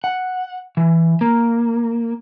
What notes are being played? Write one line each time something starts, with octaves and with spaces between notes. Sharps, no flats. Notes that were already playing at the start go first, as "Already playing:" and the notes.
F#5
E3
A#3